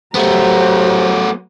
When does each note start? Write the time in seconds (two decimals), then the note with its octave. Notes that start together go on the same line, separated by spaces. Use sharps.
0.15 F#3 A3 B3 G4 C5 A#5